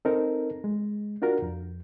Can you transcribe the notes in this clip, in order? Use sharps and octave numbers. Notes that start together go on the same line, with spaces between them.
C4 D#4 A4 A#4
G#3
D4 F4 F#4 A#4
F2